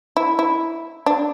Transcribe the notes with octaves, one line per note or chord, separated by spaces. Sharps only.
E4
E4
D4